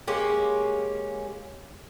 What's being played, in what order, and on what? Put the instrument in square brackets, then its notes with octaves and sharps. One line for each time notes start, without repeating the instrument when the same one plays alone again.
[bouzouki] G#3 A#3 C#4 G4